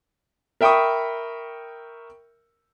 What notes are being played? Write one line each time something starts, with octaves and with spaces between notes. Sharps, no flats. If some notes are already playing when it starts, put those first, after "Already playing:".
A#4 E5 G5 B5 C#6 D#6